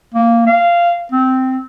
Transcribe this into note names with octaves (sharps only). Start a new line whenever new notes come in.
A#3
F5
C4